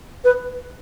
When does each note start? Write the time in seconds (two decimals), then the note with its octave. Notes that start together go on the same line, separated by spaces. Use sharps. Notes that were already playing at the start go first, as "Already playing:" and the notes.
0.24 B4